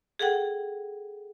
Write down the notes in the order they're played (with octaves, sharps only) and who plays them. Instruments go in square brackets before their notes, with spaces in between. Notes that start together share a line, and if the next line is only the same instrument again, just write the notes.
[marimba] G#4 A4 F#5 G5